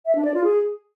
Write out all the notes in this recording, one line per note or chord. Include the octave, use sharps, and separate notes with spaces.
E5
D4
D5
F4
G#4